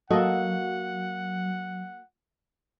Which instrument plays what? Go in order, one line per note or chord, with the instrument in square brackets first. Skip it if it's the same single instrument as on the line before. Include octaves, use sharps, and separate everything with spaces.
[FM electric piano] F#3 [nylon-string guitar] A#3 F#4 [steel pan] A4 D#5 [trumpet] F#5